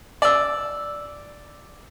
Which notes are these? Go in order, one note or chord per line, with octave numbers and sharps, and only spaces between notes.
D5 E6